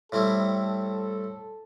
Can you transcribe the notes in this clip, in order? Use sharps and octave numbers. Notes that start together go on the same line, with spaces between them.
A2 G3 C4 E4 A4